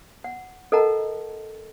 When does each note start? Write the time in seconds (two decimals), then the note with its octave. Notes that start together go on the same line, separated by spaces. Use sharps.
0.24 F#5
0.72 A4 A#4 D#5 F#5 A5 A#5